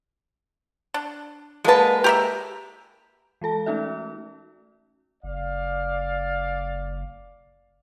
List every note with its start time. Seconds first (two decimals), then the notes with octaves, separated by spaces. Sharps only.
0.94 D4
1.65 D3 G#3 A#3 B4 A5
2.04 G4 A#4 E5
3.41 E3 G#3 A4 A5
3.66 A3 C#4 D#4 F#4 E5
5.24 F#1 D5 F5